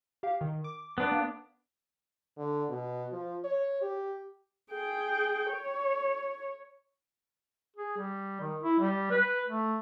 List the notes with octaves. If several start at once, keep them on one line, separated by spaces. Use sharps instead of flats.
G4 F5
D#3
D6
B3 D4 B4 D5
A#3
D3
B2
F3
C#5
G4
G#4 G5
C#5
G#4
G3
D#3
E4
G3
B4
A3